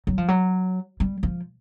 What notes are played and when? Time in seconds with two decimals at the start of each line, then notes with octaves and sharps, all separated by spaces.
0.07 F#3
0.18 F3
0.28 F#3
1.00 G3
1.23 F3